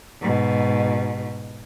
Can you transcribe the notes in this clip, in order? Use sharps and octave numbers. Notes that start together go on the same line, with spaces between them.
G#2 B2